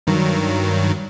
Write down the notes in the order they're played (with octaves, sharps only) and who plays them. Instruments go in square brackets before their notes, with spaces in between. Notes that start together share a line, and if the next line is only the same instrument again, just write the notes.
[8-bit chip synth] G2 D#3 F#3